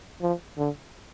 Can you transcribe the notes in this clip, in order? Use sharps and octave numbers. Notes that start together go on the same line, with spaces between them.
F3
D3